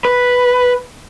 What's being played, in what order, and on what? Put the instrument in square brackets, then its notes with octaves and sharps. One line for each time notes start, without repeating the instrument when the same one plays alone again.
[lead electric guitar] B4